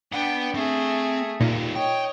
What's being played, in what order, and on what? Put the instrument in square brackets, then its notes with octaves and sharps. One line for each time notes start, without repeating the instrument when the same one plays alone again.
[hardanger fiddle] D4 G5 [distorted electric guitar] B4 F#5
[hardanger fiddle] A3 G#4 [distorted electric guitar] C4
[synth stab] A#2 [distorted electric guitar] G3 D#4
[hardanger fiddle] C#5 D#5 [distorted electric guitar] G5